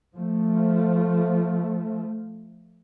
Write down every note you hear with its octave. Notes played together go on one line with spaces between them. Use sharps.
F3 A3